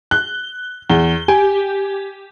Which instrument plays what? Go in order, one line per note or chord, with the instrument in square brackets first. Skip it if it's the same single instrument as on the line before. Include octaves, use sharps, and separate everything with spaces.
[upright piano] F#6 [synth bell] G7
[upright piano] E2 [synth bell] G7
[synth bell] G4 [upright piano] G#5